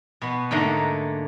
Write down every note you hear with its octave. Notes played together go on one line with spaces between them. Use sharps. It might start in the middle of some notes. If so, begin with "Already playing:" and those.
B2 B3
G#2 D3 A3 A#3 D#5 A#5